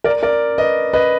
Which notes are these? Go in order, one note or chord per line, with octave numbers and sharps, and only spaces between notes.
A#4 D5
A#4 D5
B4 D#5
B4 D#5